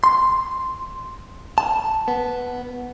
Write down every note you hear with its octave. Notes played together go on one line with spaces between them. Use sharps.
C6
A5
B3